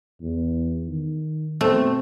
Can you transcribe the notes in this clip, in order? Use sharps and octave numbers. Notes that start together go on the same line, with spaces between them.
E2
D#3
B2 A3 C4